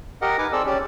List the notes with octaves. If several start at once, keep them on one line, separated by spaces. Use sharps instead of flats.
G4 A#4 D#5 F#5
D#4 B4 G#5 D6
C4 G#4 A4 D5 E6
C#4 G4 D5